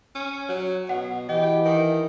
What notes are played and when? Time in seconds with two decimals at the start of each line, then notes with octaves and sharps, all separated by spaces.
0.15 C#4
0.49 F#3 C#5
0.89 B2 F#5
1.29 E3 G4 D#5
1.65 D#3